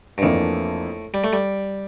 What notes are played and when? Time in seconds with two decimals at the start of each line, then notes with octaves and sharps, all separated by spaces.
0.18 G2
0.22 F2 A2 E3 A#3 D4
1.14 G3
1.24 A3
1.33 G3